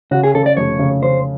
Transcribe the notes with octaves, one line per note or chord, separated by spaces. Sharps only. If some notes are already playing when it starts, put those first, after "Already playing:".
C#3 F#4
G#4
C#3 A4
D5
F1 C#5
C#3
C#3 C5